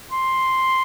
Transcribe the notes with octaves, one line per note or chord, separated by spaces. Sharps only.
C6